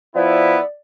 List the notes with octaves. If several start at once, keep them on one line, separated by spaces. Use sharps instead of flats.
F3 B3 E4 D5